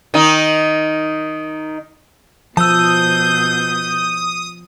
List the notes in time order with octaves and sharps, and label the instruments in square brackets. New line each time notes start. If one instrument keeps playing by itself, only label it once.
[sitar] D#3 D#4
[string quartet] B2 G6 [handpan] F3 [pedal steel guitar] A5 E6 [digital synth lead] D#6